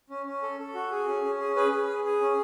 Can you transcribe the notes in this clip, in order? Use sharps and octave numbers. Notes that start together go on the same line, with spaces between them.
C#4
C#4
A4
A4
F#4
G#4
C#4
C#4
G#4
G#4 B4
G#4
G#4
G#4
C#4